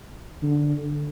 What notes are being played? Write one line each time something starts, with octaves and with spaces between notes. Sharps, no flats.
D3